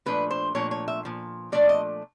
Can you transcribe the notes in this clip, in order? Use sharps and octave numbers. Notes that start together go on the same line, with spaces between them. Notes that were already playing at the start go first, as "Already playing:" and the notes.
A#2 F3 A3 D4 B4
C5
A#2 F3 A3 D4 C#5
C#5
E5
A#2 F3
A#2 F3 A3 D4 D5
D#5